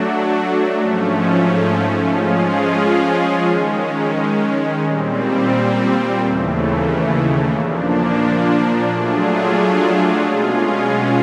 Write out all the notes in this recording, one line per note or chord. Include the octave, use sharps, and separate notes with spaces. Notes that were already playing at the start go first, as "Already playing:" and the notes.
Already playing: F#3 A3 D4 F#4
G#2 F3 A3 C#4
F3 G#3 C#4 F4 G#4
D#3 G#3 C#4
A#2 G3 C4
D#2 C#3 E3 A3
A#2 F3 A#3 D4
F#3 A3 D4 F4 G#4
B2 G#3 C#4 F4 G#4